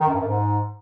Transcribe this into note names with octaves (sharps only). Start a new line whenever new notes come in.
D#3
F#2
G2
F#2
G#2